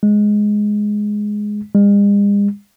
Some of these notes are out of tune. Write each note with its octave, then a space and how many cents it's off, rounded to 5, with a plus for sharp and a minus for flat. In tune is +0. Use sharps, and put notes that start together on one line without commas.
G#3 +5
G#3 -45